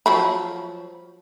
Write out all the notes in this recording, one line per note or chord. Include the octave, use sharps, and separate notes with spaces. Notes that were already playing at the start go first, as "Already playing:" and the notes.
F3 F#3 B5